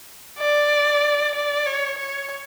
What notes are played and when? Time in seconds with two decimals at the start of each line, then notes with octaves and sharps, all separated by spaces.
0.39 D5
1.35 D5
1.66 C#5
1.98 C#5